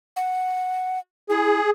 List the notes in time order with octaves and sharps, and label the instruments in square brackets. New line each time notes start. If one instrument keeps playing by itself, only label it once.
[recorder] F#5
[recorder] E4 [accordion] G#4